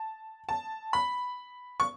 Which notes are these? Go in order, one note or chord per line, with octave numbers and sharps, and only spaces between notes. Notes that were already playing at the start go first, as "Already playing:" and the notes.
Already playing: A5
A5
B5
C#6